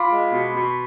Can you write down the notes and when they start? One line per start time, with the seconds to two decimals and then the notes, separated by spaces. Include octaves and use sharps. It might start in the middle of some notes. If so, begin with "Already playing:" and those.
Already playing: F4 B5 C6 D6
0.10 G#3
0.33 B2
0.56 B2